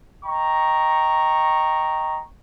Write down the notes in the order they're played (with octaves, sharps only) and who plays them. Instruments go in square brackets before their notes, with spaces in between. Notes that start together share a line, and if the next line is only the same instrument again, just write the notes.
[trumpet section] D#5 G5 A#5 C#6